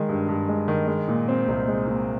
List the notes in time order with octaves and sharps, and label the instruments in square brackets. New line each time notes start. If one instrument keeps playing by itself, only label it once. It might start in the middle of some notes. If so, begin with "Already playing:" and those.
Already playing: [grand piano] D#3 G#3
G2
G2
G#3
D#3
G#3
A#2
C4
C2
G#3
A#2